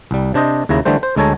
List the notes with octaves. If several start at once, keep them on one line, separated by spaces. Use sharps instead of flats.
C2 G3
C3 D4 C5 D#5
D#2 C#3 E4 A#5
D3 E3 G3 A3 C5
C5
D2 G#3 A4 C#5 A5 A#5